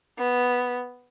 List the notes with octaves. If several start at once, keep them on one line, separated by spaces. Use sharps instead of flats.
B3